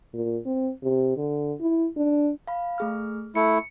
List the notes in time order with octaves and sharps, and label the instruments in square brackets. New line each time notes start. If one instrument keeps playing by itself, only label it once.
[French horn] A#2
C4
C3
D3
E4
D4
[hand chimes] F5 B5
A3 G#4 F6
[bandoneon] A3 E4 [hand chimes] C#7